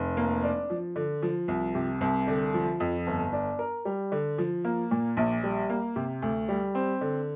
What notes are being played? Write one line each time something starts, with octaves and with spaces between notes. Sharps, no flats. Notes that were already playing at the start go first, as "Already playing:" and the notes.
Already playing: F1
A#3
D4
F3
D3
F3
C2
C3
C2
D3
F3
F2
G1
D4
A#4
G3
D3
F3
A#3
A#2
A#1
G3
A#3
C3
D2
G3
C4
D3